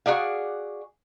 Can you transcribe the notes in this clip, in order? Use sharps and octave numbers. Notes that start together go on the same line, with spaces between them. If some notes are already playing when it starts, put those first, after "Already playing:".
F#4 G#4 D5 F5